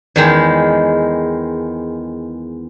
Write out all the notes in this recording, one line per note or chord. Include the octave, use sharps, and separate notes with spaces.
E2 D#3 G#3